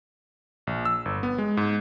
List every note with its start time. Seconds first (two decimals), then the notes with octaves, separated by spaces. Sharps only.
0.67 A#1
0.85 E6
1.05 G1
1.23 B3
1.38 G#3
1.57 G#2